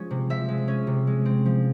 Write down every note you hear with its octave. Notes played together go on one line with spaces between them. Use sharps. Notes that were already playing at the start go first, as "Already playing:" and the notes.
Already playing: F3 G#3 C#4
C3
F3 E5
G#3
C#4
C3
G#3
C4
F3